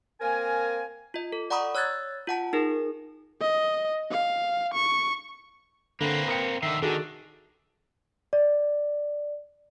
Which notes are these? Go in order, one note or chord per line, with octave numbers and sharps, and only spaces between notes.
A#3 C4 A#4 F5 G#5
F4 D#5
A4
D5 F#5 A#5 B5 C#6 D#6
C#5 E6 F#6 G#6 A6
F4 F#5 A5
D#4 G#4 A#4
D#5
F5
C#6
D3 A#3 C4 B4 E5
A#4 G5 D#6 C#7
D3 D#3 E5 C7
D#3 D4 F#4 G#4 A4
D5